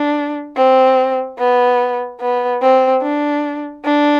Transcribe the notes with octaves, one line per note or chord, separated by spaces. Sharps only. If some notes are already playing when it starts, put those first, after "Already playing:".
Already playing: D4
C4
B3
B3
C4
D4
D4